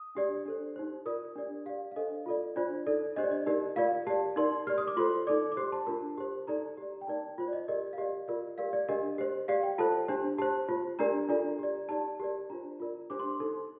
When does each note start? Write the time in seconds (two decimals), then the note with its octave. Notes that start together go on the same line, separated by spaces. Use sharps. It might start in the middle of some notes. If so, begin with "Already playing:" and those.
Already playing: D#6
0.15 D4 G4 D5
0.45 D4 A4 C5
0.76 D#4 G4 C5
1.06 F4 A#4 D5 D#6
1.36 D4 G4 D5
1.66 G4 D5 F5
1.92 F5
1.96 D4 A4 C5 D#5
2.26 F4 A4 D5
2.56 D4 F4 C5 D5
2.86 D#4 A4 D5
3.16 D4 G4 C5 D#5
3.24 D5
3.31 D#5
3.46 D#4 G4 A#4 D5
3.76 F4 A#4 D5 F5
4.07 G4 D5 A5
4.36 D#4 A#4 D5 C6
4.67 G4 D5 F6
4.78 D#6
4.87 D6
4.97 F4 A4 C5 C6
5.27 D#4 A4 D5 D6
5.52 D6
5.57 G4 C5 C6
5.72 A5
5.87 D4 F4 A#4
6.18 G4 C5
6.47 D#4 A4 D5 A#5
6.77 G4 D5
7.01 G5
7.07 D#4 A#4 D5 A5
7.38 F4 C5
7.48 D5
7.53 D#5
7.68 G4 A#4 D5 D#5
7.93 F5
7.98 G4 D5 D#5
8.28 F4 A#4 D5
8.58 G4 A#4 D5 F5
8.73 D5
8.89 D4 G4 A#4 D#5
9.18 G4 C5
9.48 G4 D5 F5
9.63 G5
9.78 F4 A4 C5 A5
10.08 D4 G4 C5
10.38 G4 C5 A5
10.69 F4 C5
10.99 D4 G4 A#4 D5 A#5
11.29 D4 F4 A4 D5 A#5
11.59 G4 D5
11.89 D#4 G4 D5 A5
12.20 G4 A#4 D5
12.50 D4 F4 C5 A#5
12.80 F4 A#4 D5
13.10 D4 G4 C5 D6
13.20 C6
13.30 D6
13.40 D#4 A4 C5 C6